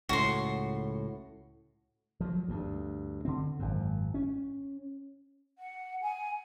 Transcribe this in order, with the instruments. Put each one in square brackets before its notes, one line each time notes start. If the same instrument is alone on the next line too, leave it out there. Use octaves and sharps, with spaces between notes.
[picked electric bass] C#2 A2 [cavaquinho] F#4 C6
[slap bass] F3 F#3
D2 G2
D3 C4
G#1 F#2
C#4
[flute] F#5
G#5